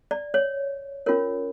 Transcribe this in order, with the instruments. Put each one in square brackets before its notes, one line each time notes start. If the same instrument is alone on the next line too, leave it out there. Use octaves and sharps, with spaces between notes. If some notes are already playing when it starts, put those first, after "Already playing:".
[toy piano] D5
C#5
C#4 F4 A#4 C#5